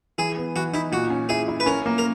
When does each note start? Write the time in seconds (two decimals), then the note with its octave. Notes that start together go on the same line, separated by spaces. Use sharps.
0.18 E3 G#4
0.37 B3
0.56 E3 F#4
0.73 D#4 E4
0.92 A#2 F#4
1.10 C#4
1.29 E4 G#4
1.48 E4
1.60 B4
1.66 C#4 A#4
1.86 A#3
1.98 A#4